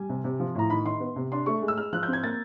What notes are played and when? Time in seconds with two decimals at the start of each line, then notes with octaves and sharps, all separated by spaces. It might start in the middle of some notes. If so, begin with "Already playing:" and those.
Already playing: G3 G#5
0.09 C3
0.24 C3
0.40 F3
0.55 A2 A#5
0.70 D#3 B5
0.85 D#3 C6
1.00 B3
1.16 C3
1.32 D4 C6
1.46 A3 C#6
1.62 G#3
1.68 E6
1.77 G#3 F6
1.93 F3 F#6
2.03 G6
2.08 C4
2.13 G#6
2.23 A#3 A6